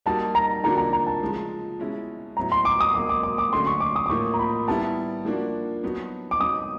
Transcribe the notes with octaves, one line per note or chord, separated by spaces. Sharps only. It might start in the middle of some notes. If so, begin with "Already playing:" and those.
G3 A#3 D#4 F#4 A5
A#5
D3 F3 A#3 D4 F#4 A#5
A#5
A#5
A5
C#3 F3 G#3
B2 G#3 C#4 E4
A2 F#3 B3 E4 A#5
C6
D6
D#6
B2 F#3 A#3 D6
D6
D6
D6
D3 F#3 A3 C#4 F#4 C6
C#6
D6
D#6
D6
A2 F3 A#3 C#6
A#5
B5
G3 B3 E4 A5
F3 A#3 D4 F#4
F#3 B3 D#4 F#4
D6
F#3 B3 D#4 D#6